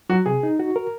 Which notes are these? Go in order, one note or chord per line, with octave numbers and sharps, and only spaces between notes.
F#3 F#4
C3 G#4
D#4
F#4
A#4